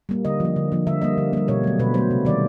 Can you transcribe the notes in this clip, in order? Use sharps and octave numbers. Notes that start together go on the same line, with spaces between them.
G3 A#3
D3 D#5
F3 A#3
D3
F3 A#3
D3 E5
G3 A#3 D#5
D3
G3 A#3
B2 C#5
F#3 A3
B2 B4
F#3 A3 C5
C3
D#3 G3 D5